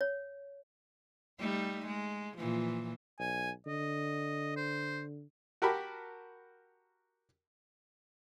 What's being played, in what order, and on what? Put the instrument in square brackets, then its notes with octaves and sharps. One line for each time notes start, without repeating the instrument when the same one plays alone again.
[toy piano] C#5
[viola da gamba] G3 A3 D#4
G#3
A#2 E3 F3
[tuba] B1 [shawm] G#5
[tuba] D3 [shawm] D#5
[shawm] C5
[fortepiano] F#4 G4 A#4 A5 B5